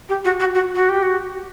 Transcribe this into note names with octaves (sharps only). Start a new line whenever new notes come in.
G4
F#4
F#4
F#4
F#4
G4
F#4